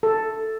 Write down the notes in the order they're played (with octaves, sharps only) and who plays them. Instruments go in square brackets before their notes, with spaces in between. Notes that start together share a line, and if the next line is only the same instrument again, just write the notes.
[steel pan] A4